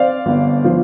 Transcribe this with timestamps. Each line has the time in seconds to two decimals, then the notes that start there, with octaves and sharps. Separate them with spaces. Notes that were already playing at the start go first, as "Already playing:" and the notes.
Already playing: C4 D5 F5
0.26 G1
0.64 F3